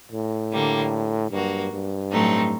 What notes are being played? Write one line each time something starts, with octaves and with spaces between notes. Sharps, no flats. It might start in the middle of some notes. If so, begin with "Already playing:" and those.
A2
D3 G3 A#3
G2 F#3 A#3 F#4
G2
A2 F#3 A3 C4 D#4